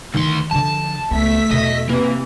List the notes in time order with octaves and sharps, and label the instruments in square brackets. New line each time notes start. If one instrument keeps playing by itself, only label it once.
[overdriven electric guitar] D2 C6 [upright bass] D#3 E3
[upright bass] D3 F3 [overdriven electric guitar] A5
[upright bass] C#2 B3 [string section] A3 E5 B6
[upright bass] E2 B2 [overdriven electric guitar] D#5
[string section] C3 E3 [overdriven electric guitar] A#3